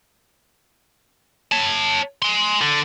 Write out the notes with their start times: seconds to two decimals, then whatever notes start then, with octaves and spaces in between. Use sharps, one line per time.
1.52 C#5 A5
2.22 G#5 C6
2.61 D3